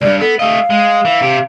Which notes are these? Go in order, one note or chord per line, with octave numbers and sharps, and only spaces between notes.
C#2 G2 D5
B3 A4
A3 D#5 F5
G#3
E3
C3 G4